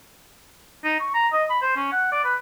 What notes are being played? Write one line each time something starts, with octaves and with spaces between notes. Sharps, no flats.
D#4
C#6
A#5
D#5
B5
C5
C#4
F#5
D5
B4